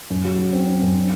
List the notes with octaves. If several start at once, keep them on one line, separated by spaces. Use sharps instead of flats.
F#2
F#3
F#3
C4
C4
F#2
D4